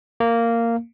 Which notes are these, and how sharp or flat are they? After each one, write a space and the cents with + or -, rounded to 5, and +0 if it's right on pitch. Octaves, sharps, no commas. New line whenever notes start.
A#3 -10